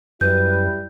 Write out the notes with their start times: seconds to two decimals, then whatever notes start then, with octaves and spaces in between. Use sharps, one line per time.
0.21 F#2 G3 E4 B4 G6